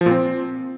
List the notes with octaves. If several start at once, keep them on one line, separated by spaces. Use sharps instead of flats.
F3
A#2
C4